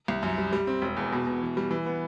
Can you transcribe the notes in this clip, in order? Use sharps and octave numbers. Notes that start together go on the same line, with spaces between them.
C2
F#2
G3
G3
C4
E1
E2
B2
B2
E3
G3
E3
B3